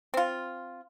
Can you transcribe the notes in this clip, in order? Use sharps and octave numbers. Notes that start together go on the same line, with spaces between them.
C4 F4